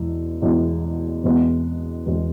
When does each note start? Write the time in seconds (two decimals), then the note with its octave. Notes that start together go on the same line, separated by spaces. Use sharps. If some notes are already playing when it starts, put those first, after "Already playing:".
Already playing: E2 B2 G#3 E4
0.41 E2 B2 G#3 E4
1.24 E2 B2 G#3 B3
2.06 E2 B2 G#3 B3